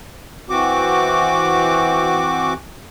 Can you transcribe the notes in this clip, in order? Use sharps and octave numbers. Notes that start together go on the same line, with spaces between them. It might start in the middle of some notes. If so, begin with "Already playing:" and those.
E3 C4 F#4 D6